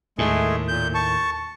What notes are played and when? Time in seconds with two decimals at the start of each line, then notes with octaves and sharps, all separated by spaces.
0.18 D#2 A2 G#3 A3 G#4
0.68 A#2 G6
0.94 A5 C#6